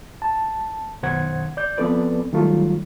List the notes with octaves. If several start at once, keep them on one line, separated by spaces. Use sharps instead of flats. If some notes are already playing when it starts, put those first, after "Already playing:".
A5
F#2 B2 D#3 C5 F#5 G#6
D5 G6
F3 B3 C4 A4 B4 D5
D#3 F#3 G3 A3 F4